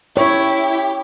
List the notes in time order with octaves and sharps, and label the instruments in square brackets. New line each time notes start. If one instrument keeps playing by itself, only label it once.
[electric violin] E4 [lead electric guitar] G4 [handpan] C#5